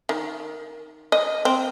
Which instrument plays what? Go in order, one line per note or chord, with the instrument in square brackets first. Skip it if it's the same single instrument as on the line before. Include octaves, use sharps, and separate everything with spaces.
[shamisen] D#3
D#5
C4